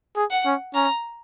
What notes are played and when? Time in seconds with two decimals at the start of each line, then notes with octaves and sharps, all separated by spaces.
0.16 G#4
0.31 F#5
0.46 C#4
0.74 C#4 A#5